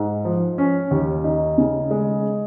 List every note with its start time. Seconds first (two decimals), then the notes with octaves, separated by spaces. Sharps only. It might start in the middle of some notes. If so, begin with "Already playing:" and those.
Already playing: G#2
0.25 F3
0.58 C#4
0.91 D#2
1.24 D#4
1.58 C#3
1.91 G#3